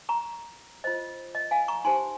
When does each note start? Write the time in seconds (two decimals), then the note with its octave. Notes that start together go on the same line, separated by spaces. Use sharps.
0.09 A#5 C#6
0.84 F4 C5 D#5
1.35 D#5
1.51 F5 G#5
1.68 A#5 C#6
1.85 D#4 G4 C5 G#5 C6